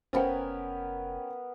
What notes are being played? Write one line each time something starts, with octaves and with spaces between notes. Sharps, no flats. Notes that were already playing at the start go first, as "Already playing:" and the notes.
F1 B3 C#4 A#4 C5 F5 G5 G#5